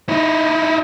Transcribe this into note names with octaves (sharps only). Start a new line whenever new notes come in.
D#4 E4